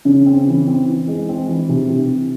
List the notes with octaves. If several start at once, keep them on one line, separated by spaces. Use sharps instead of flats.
C#3
C4
E3
C4
E3
G#3
C4
E3
C3
C3